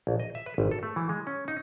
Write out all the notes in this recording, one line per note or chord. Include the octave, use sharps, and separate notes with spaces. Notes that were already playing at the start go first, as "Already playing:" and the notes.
A#1
D#5
E5
B4
G#1
A4
A3
E3
G#3
C#4
D#4